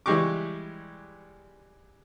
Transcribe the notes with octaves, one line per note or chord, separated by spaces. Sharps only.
E3 G3 G#3 G4 C#6 D6